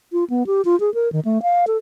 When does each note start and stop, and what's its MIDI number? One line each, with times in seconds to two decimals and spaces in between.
0.13 0.24 65
0.30 0.46 59
0.47 0.62 67
0.65 0.78 65
0.80 0.93 68
0.94 1.11 70
1.12 1.20 51
1.25 1.42 57
1.42 1.65 77
1.67 1.77 69